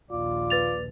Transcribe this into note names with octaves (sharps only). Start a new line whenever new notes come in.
A#1 D#2 F4 D5
B4 A6 F7